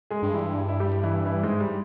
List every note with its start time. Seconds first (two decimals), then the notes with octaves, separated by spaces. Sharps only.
0.10 G#3 G#4
0.23 G2
0.33 E3 E4
0.69 E4
0.80 G3 G4
1.03 E3 E4
1.26 E3 E4
1.43 G#2 G#3
1.60 G3